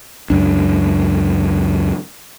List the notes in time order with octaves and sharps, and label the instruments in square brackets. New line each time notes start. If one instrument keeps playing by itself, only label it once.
[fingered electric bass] C#2 F#2 D4